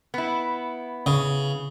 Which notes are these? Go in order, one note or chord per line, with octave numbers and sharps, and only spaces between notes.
B3 E4
C#3